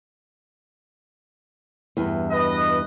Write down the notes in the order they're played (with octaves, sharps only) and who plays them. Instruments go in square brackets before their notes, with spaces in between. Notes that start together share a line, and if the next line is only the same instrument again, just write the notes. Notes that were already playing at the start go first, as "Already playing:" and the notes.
[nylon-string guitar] E2 G2
[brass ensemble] B4 D#5